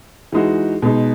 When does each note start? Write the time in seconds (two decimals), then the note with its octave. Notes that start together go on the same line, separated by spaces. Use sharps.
0.32 E3 G#3 D#4 F#4
0.82 B2 G#3 D#4